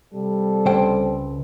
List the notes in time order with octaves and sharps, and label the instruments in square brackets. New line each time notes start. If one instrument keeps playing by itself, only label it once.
[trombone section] C3 G3 A4
[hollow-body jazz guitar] C#2 C5 G5